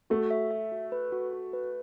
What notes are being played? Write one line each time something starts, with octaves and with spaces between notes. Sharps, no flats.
A3 F#4
E5
E5
F#4
B4
F#4
F#4
B4